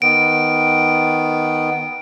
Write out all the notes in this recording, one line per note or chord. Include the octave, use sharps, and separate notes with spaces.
D#3 B3 D7